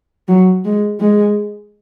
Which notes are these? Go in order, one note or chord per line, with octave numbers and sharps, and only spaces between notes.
F#3
G#3
G#3